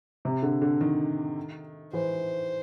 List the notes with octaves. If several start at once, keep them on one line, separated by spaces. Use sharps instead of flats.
C3
D3
D3
D#3
E3 C5